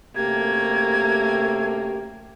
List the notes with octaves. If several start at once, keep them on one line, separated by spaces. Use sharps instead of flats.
F#2 C3 A3 A#3 G4 G#6